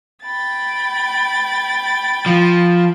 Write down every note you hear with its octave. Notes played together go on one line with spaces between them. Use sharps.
G5 B5 A6
F3